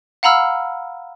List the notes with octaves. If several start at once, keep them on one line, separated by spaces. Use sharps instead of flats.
F5 F#5 A#5 B5 E6 F6